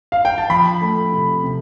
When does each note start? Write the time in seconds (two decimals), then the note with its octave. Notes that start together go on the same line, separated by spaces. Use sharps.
0.12 F5
0.25 G5
0.38 A5
0.50 F3 B5
0.81 A3
1.12 C3
1.44 C3